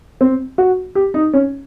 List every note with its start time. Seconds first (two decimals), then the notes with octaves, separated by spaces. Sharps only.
0.21 C4
0.58 F#4
0.95 G4
1.14 D#4
1.33 C#4